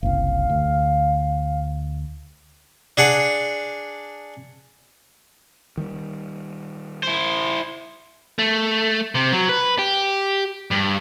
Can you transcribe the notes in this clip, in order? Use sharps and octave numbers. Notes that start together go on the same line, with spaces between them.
F#1 C2 F5
D2
D4 G#4 F#5
D#3 G3
E4 C5
A3
C3
F#3
B4
G4
G2